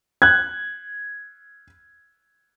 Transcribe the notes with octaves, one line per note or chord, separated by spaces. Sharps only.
F#6 G#6